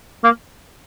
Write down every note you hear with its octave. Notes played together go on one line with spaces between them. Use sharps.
A#3